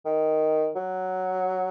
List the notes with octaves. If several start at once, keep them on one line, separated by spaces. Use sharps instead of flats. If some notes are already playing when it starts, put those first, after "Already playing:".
D#3
F#3